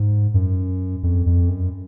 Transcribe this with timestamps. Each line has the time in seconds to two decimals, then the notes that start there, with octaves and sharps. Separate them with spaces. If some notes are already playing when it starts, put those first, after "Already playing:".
Already playing: G#2
0.34 F#2
1.03 F2
1.26 F2
1.49 F#2